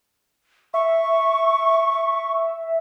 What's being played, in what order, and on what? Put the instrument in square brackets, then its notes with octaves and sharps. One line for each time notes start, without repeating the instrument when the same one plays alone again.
[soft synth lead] E5 [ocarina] C#6